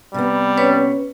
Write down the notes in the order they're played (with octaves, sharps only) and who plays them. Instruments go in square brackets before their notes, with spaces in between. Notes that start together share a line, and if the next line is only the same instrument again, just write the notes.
[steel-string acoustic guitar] C3 B3 [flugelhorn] G3
[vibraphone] C#4 B4 C#5